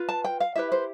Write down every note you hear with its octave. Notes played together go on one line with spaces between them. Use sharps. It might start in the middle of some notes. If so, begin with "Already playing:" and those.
Already playing: F4 B4
A5
G5
F5
E4 G4 B4 E5
C5